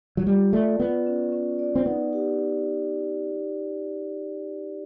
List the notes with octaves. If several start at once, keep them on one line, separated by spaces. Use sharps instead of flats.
F#3
G3 F4
A3 D5
B3 F4
C#4
C#4
D5
C4
B3 D#4
G4